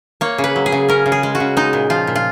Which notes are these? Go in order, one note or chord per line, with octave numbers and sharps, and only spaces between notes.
A#3 C#5
C#3
B4
F#3
G#4
C#3
C#4 A#4
C#3
G#4
G#3
F#4
C#3
G#3 D#4
A#2
F3 F4
A#2
F4